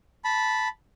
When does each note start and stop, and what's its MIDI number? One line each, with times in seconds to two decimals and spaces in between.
0.24 0.68 81
0.24 0.68 83